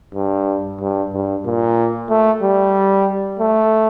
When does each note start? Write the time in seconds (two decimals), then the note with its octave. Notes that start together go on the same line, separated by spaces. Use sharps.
0.15 G2
0.80 G2
1.13 G2
1.45 A#2
2.09 A3
2.42 G3
3.40 A3